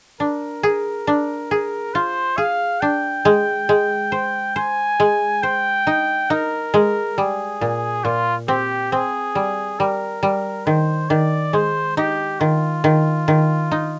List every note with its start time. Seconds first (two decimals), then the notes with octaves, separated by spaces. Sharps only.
0.20 D4 A#4
0.63 G#4
1.07 D4
1.51 G#4
1.94 F4 C5
2.37 G#4 F5
2.81 D4 G5
3.25 G#3
3.69 G#3
4.12 C5
4.56 C5 G#5
5.00 G#3
5.43 C5 G5
5.87 D#4
6.30 D#4 A#4
6.74 G#3
7.18 G3 G#4
7.61 A#2
8.04 A#2 F4
8.48 C4 G4
8.92 C4 G#4
9.35 G3
9.79 G3 A#4
10.23 G3
10.66 D#3 C5
11.10 D#3 D5
11.53 G#3 C5
11.97 D#4 G4
12.40 D#3 F4
12.84 D#3
13.28 D#3
13.71 D#4